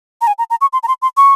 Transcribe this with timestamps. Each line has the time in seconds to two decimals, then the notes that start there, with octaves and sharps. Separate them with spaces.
0.21 A#5
0.27 G#5
0.38 A#5
0.50 A#5
0.61 C#6
0.73 C6
0.83 A#5
0.88 C6
1.02 C6
1.17 C#6